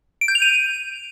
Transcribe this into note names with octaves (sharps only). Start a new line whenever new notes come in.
D7
G6
F7
D#7